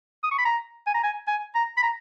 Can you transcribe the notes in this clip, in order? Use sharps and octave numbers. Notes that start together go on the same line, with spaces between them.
D#6
C#6
B5
A#5
G#5
A#5
G#5
G#5
A#5
B5
A#5